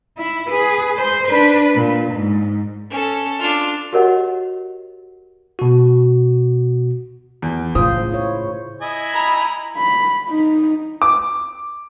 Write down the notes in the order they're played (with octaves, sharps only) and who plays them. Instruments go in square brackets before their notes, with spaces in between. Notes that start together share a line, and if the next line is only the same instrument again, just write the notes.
[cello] E4
G#4 B4
C5
D4 B4
A#2
G#2
[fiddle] C#4 A4
D4 F4
[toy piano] F#4 G4 A#4 C#5 D#5 F#5
[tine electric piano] B2 F#4
[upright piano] E2
[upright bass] A2 [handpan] C#3 F4 C5 [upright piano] D#6
[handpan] E4 C#5
[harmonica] E4 D#5 G#5
[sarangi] A#5 [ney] B5
[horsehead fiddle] B5
D#4
[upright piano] D6